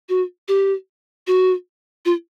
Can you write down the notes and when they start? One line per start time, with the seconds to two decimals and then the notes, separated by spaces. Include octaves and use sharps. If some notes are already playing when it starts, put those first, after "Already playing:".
0.09 F#4
0.48 G4
1.27 F#4
2.05 F4